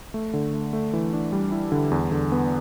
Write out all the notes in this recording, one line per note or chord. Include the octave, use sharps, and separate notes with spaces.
A3
D3
A3
A3
E3
D4
G3
E4
D3
E2
D3
B3